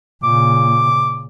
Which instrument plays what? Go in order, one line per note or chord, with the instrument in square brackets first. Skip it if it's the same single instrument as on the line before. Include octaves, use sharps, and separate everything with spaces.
[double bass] A#2 C#3 [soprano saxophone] D6